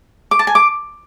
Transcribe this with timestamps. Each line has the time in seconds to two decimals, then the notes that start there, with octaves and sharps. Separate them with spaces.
0.31 D6
0.39 A5
0.47 G#5
0.55 D6